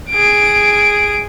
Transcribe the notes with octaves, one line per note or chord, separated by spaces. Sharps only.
G#4 D7